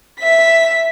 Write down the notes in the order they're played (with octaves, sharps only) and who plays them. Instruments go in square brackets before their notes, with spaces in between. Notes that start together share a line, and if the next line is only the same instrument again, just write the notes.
[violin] E5 B6